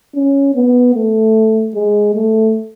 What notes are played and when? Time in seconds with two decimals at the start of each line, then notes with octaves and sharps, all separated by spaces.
0.15 C#4
0.55 B3
0.95 A3
1.75 G#3
2.14 A3